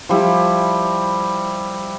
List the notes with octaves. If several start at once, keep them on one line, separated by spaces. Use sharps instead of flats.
F3 G3 E4